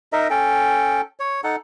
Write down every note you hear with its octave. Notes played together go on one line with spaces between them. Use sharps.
D#4 A#4 D#5 E5
C#4 A4 G5
C#5
D#4 A4 F#5